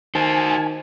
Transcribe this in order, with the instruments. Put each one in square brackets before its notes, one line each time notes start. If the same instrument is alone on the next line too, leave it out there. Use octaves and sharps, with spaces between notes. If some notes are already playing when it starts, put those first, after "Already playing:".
[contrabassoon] D#3 [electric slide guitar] F#4 C5 [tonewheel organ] G#5 [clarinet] A5